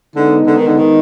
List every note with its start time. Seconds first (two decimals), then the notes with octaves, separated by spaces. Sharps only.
0.16 D3 G#3 B3 D#4
0.46 D3
0.56 D#3
0.66 D3
0.77 D#3